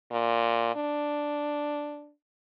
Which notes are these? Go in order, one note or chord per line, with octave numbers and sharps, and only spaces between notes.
A#2
D4